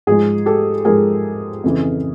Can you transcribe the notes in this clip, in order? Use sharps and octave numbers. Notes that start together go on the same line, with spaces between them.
G#2 F3 G#3 G#4
G4 A4
G#2 F3 G#3 G#4 A#4
F2 C#3 E3